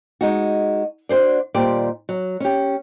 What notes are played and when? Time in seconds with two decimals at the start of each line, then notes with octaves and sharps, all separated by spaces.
0.21 G#3 D#4 F#4
1.09 D4 F#4 G#4 C5 D5
1.54 D#2 A#2 G3 G4 C5 D5
2.09 F#3
2.40 C#4 G4